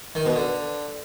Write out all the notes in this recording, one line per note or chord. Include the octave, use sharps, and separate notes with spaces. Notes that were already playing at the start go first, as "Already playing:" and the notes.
D#3
B2
D3